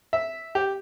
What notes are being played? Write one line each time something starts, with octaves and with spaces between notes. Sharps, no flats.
E5
G4